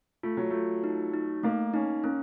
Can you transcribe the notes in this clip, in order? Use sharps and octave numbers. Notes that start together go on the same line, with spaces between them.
A3 F4
F#3
A3 F4
D#4
D#4
A3 A#3
C#4 D#4
A#3 C#4